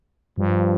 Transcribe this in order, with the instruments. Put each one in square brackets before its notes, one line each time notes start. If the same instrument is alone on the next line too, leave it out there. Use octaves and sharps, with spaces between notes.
[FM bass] G2 [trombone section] F3